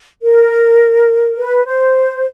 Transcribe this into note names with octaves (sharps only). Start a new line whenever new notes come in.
A#4
B4
C5